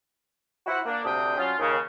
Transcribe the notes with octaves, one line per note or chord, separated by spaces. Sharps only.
E4 F#4 C5 F#5
A#3 D4
D2 C3 C4 D4 G5 D#6
F#3 C#4 F4
D#2 C#3